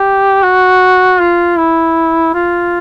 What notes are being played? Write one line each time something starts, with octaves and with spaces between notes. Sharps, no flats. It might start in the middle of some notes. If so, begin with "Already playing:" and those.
Already playing: G4
F#4
F4
E4
F4